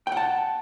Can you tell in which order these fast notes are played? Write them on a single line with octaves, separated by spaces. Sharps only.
G5 F#5 A5